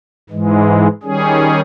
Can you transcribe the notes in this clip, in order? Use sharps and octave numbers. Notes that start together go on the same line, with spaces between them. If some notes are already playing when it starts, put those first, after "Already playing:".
G#2 E3 G#3
D#3 G3 C#4 G#4